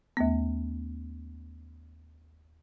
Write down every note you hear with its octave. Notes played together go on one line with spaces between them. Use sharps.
D#2 A3 B3